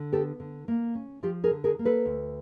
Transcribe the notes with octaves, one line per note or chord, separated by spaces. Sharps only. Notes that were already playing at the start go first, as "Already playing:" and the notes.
Already playing: D3
B3 G4 A4
D3
A#3
C#4
F3 F4 G4
G#4 A#4
D3
G#4 A#4
A#3
A4 B4
D2